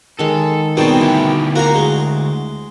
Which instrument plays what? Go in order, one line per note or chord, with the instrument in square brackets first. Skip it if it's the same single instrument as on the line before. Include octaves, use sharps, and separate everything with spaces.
[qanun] D#3 G#3 [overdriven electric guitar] A4
[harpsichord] B2 D#3 G3 [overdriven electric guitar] C4 [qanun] G#4 A5
[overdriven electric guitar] D2 G4 [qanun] E4
[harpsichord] A#3 A#4 [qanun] F#4 A#5
[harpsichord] G#3